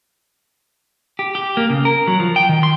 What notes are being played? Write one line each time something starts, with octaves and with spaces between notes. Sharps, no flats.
G4
G4
A#3
C#3
A#4
F#3
F3
G5
D#3
C6